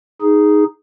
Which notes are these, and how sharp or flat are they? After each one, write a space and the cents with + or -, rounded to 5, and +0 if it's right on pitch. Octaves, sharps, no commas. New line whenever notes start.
D#4 +0 G#4 +0